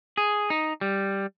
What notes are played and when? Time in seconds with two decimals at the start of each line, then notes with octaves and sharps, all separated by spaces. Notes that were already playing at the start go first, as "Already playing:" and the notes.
0.17 G#4
0.50 D#4
0.81 G3